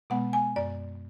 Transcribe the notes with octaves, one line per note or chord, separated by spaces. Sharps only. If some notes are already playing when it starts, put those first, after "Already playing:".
B2 G#3 B3 F#5
G#5
F#2 D5